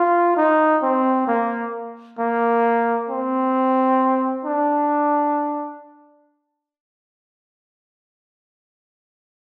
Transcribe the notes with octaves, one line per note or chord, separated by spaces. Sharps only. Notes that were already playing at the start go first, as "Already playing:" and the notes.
Already playing: F4
D#4
C4
A#3
A#3
C4
D4